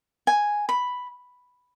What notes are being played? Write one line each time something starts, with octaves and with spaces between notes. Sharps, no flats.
G#5
B5